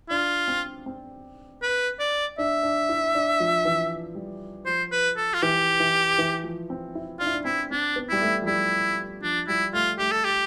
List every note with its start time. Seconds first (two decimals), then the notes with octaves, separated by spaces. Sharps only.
0.09 D4 F4
0.48 C4
0.86 C4
1.62 B4
2.00 D5
2.38 D4 E5
2.63 D4
2.89 E4
3.15 D4
3.40 F3
3.65 E3
4.15 G3
4.66 F3 C5
4.92 B4
5.17 A4
5.34 F4
5.42 E3 G4
5.80 E3
6.18 E3
6.44 F3
6.70 C4
6.95 E4
7.19 D4 F4
7.26 E4
7.34 D4
7.45 C4 E4
7.71 C4 D4
7.96 B3
8.09 G3 E4
8.21 A3
8.42 F3
8.47 G3 E4
9.23 F3 D4
9.48 G3 E4
9.73 A3 F4
9.99 A3 G4
10.12 A4
10.25 G4